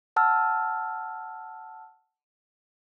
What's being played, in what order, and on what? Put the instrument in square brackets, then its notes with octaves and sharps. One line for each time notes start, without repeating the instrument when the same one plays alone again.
[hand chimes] F#5 A5 E6 F6